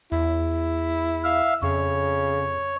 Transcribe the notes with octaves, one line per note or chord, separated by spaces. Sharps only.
E2 E4
E5 F5
F2 C#3 C#5